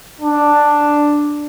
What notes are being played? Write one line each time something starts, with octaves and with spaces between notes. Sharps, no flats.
D4